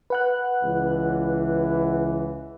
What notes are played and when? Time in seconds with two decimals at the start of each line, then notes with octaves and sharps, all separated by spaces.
0.10 B4 F#5 F#6
0.63 C#2 E3